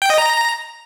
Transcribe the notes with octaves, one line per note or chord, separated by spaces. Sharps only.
G5
D#5
A#5